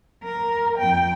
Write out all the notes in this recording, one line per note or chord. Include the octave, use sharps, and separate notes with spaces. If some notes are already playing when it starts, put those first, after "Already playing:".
A#4
F2 G5